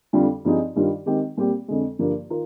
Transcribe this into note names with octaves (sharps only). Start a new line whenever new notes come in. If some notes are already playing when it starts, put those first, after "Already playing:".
F2 D3 G3 D4 F4
G2 F3 C4 D#4 G#4
G2 D#3 G3 D4 F4
D#3 G#3 C4 G4
A#2 G3 C4 G4
F2 D3 G#3
G2 D3 F3 A#3
D#3 F4 A#4